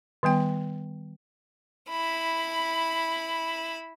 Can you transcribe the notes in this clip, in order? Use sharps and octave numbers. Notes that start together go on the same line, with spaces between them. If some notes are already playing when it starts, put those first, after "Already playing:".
D#3 G3 B3 G5
E4 B5